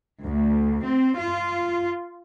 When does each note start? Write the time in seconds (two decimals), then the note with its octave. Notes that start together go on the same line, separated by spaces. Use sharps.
0.24 D2
0.83 C4
1.18 F4